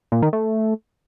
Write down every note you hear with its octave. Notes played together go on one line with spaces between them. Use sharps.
A#2
D#3
A3